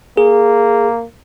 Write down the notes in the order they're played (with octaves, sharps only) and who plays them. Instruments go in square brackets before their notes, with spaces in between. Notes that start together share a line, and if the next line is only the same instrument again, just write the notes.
[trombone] A#3 [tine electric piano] G#4